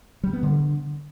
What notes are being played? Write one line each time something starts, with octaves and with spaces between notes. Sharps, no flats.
G3
B3
D3